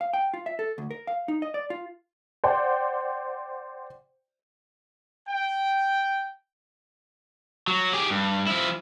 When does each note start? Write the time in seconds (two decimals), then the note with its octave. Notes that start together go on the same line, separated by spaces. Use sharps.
0.01 F5
0.13 G5
0.34 F4
0.46 E5
0.59 A4
0.78 D2
0.91 A#4
1.07 F5
1.28 D#4
1.42 D#5
1.54 D5
1.70 F4
2.44 C5 D5 F#5 G5
5.29 G5
7.68 F#3
7.93 G4 G#4
8.10 G2
8.47 F3 E4